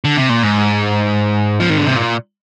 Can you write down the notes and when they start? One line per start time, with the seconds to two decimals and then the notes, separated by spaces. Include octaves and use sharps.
0.05 D3
0.17 C3
0.30 A#2
0.43 G#2
1.60 F3
1.70 D#3
1.78 D3
1.86 C3
1.96 A#2